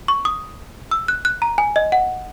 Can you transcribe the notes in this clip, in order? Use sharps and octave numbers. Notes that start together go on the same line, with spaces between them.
C#6
D#6
E6
F#6
F#6
A#5
G#5
D#5
F#5